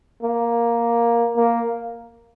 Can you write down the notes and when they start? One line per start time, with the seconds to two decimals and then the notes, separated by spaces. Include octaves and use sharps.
0.23 A#3
1.37 A#3